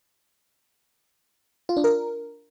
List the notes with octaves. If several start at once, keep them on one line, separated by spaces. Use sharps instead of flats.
F4
D4
A#4